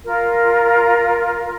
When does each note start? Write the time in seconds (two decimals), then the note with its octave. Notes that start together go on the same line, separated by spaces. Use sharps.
0.05 F4 A#4